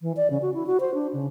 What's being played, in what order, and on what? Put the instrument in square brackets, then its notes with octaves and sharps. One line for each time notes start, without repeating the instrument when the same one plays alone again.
[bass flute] E3
D5
C#3
F#4
E4
F#4
C5
D4
C#3